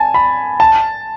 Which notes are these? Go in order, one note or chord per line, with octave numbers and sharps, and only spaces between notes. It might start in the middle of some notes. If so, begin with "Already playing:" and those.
Already playing: G#5 A5
B5
A5